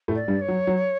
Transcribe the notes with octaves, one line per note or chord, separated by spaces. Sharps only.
A2 A3
D5
G2 G3
C#5
F#3
F#3